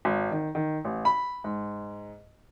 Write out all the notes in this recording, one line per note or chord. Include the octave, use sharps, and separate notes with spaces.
G#1
D#3
D#3
A1
B5
G#2